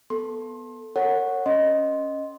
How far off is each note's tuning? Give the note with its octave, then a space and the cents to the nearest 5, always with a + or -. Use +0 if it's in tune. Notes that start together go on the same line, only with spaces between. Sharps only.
B3 +0 A4 +0 C6 +30
A#4 -30 C#5 +0 F#5 -5
C#4 +0 D#5 +0 C6 +0